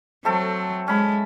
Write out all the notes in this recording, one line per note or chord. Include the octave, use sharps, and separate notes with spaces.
F#3 A3 C4 A4
G#3 C#4 B5